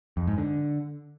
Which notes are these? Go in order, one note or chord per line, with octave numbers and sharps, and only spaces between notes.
F2
G#2
D3